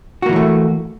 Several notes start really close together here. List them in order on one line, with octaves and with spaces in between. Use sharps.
F#4 A#3 E3 F#3 A3